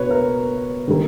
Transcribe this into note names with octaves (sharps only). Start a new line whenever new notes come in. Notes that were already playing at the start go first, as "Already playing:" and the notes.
Already playing: B2 B4 C#5
A#4
D#3 G3 A#3